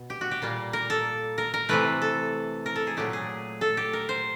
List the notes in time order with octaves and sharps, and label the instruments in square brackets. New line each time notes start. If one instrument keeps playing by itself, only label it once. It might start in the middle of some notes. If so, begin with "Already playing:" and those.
Already playing: [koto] B2
G4
F#4
G4
A#2 G3 A#3
A#4
A4
A#4
A#4
C3 E3 A3 B4
A4
A#4
A4
G#4
A#2 F#3 A3 G4
G#4
A4
G4
A#4
C5